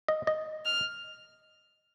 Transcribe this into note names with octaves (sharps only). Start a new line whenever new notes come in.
D#5
D#5
F6